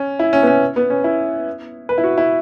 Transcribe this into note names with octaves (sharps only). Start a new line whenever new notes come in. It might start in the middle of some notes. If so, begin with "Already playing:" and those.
Already playing: C#4
E4
C#4
B3
C#4
B3
C#4
E4
B4
E4
F#4
E4